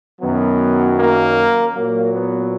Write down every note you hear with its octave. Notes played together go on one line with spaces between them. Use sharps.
F#2 D#3 F#3 B3
A#3
A#2 F#3 A#3
B3